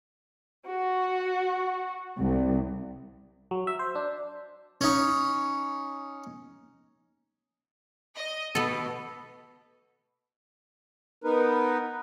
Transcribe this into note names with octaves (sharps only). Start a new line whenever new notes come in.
F#4
C2
F#3
E5
C5
D4
C#4 D#4
D#5
B2 B3 A4
B3 D#4 A#4 B4